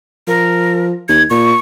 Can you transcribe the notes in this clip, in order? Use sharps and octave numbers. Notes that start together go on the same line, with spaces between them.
F3 A#4
D#2 G#6
A#2 C#6